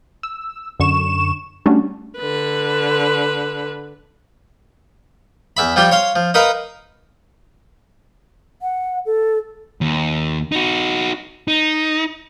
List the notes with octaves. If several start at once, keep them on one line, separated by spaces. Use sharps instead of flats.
E6
F#2 D3 C#6 E7
G3 A3 C#4 D4 F#4
D3 B4
E2 E5 B5
F3 G3 F4 G4
C#5 F5 C6
F3
D#4 A#4 B4 F5
F#5
A4
D#2
D#4 F#4
D#4